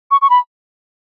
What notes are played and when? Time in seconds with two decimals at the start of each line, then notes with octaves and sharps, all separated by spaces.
0.11 C#6
0.22 C#6
0.30 B5